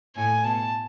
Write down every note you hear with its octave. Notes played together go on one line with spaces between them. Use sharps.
A2 G#5
B2 A5